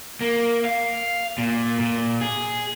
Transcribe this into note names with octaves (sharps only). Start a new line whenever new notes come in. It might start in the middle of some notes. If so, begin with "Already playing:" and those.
A#3
F5
A#2
A#2
G#4